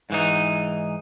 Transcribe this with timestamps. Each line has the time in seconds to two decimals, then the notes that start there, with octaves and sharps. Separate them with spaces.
0.10 G#2 E3 D#4